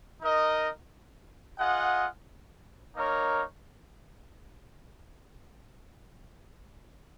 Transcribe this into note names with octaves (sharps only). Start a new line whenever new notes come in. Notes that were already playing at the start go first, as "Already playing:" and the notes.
D#4 A#4 D#5
F4 G#4 D#5 F#5
A#3 D#4 A#4 C#5